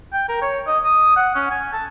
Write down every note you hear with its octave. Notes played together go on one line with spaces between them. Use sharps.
G5
A#4
C#5
D#5
D#6
F#5
C#4
G#5
A5